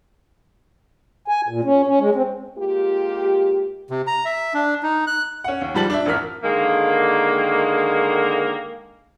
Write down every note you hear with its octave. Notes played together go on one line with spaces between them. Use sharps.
G#5
A#2
C#4
C#4
G#3
C4
G#3 A#3 F4 G4
C3
A#5
E5
D4
D#4
F#6
C#4 F#5
D#2
G#2 F3 G3 A5 A6 F#7
D4 E5
A1 F2 A#4 F6 B6
D3 D#3 G#3 A#3